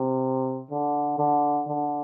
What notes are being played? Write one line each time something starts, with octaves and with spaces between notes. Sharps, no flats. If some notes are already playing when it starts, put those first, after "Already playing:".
Already playing: C3
D3
D3
D3